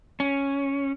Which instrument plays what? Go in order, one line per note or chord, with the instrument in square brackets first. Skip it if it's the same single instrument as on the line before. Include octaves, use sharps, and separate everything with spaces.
[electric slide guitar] C#4